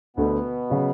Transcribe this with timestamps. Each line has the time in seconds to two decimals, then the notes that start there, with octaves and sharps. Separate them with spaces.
0.17 D2 B2 D3 A3 B3
0.70 C#3 F#3